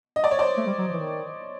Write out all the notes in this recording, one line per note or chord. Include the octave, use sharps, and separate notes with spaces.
D#5
D5
C#5
C5 D5
A3
G3
F#3
F3
E3
D#3